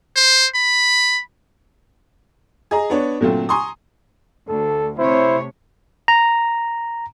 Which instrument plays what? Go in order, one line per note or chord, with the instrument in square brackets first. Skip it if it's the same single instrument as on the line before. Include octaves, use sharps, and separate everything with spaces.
[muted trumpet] C5
B5
[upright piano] G#4 D#5 A#5
B3 D4 C#5
A#2 D3 F#3 A3 C4 F4
G#5 A#5 C6 C#6 D#6
[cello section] D2 [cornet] A4
[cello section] C3 A3 C#5 [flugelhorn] E4 [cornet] C5
[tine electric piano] A#5